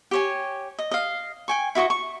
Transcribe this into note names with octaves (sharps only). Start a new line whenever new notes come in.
G4 C#5 G#5
D#5
D#5 F5
G5 G#5 C#6
E4 F#4 D#5 C#6
C#6